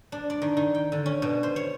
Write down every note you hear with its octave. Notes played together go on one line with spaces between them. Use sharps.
D4
D5
D#3
D#3
G5
D3
C#4
B2
C5
C#5